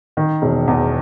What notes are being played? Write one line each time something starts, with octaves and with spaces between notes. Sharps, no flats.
D#3
E1
E2